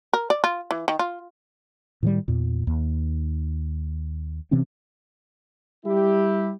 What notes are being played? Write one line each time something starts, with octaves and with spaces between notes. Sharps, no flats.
A#4
D5
F4
E3
D#3
F4
A2 D#3 F3 G3
E2 A#2
D#2
C3 E3 C4 C#4
G3 E4 G4